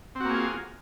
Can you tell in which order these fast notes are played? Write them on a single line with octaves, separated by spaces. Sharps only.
C4 F#4 A#3 G#4 F4